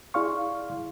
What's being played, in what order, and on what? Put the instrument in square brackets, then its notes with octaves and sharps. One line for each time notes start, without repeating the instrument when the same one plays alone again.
[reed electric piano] E4 G#4 D5 F5 C6 C#6